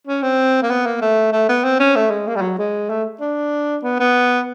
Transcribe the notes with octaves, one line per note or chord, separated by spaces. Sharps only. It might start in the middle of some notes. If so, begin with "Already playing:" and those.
C#4
C4
A#3
B3
A#3
A3
A3
B3
C4
C#4
A3
G#3
A#3
G3
F#3
G#3
A3
D4
B3
B3